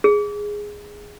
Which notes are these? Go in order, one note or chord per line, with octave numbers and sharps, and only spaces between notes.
G#4